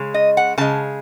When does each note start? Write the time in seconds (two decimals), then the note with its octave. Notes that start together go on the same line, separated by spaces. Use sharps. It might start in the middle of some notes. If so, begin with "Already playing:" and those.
Already playing: C#3 G#3
0.14 D#5
0.37 F#5
0.58 C#3 G#3 A5